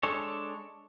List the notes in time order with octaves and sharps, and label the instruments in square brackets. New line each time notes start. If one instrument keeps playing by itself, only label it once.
[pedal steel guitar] G#3 D4 A4 C#5